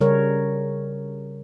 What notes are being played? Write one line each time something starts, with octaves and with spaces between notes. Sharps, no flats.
C#3 G3 A#4 C#5